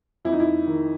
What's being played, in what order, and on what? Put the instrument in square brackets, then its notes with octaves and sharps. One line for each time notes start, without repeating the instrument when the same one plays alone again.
[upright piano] F2 E4
D#4
E4
D#3